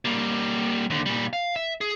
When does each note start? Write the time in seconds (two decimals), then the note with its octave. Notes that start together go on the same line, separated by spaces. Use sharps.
0.05 G3 A#3
0.90 D#2 D3
1.06 A#2 G3
1.33 F5
1.56 E5
1.81 G#4